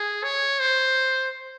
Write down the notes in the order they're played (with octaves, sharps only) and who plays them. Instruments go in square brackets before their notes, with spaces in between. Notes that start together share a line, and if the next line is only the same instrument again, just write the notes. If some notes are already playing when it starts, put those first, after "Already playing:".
Already playing: [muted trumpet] G#4
C#5
C5